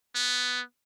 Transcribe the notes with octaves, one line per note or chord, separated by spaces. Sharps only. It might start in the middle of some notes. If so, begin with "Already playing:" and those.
B3